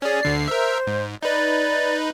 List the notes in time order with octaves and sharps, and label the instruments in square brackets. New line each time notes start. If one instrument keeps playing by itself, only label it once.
[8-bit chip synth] C#4 G#4 [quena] D5
[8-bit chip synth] D2 D3 C7
[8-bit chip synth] A#4 E5 [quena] C5
[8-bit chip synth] G#2
[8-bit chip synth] D#4 B4 [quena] D5